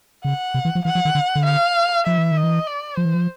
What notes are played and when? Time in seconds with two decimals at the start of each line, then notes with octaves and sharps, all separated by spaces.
0.24 C#3 F#5
0.54 C3
0.65 E3
0.75 F3
0.85 E3 F#5
0.95 F3
1.05 D#3
1.15 D3
1.35 D3
1.45 F5
2.07 F3 E5
2.18 E3
2.31 D#3
2.37 D#5
2.43 E3
2.67 D5
2.97 F3 C5
3.05 E3
3.14 F3